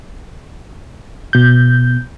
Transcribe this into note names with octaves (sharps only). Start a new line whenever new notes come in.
B2 G6